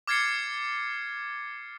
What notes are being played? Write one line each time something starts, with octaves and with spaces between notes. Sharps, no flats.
D6 F6 G#6 A6 C7 C#7